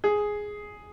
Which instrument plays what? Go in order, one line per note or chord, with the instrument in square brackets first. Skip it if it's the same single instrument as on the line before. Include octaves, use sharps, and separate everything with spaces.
[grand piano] G#4